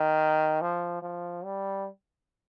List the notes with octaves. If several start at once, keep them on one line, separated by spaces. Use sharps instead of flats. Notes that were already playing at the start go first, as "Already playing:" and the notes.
Already playing: D#3
F3
F3
G3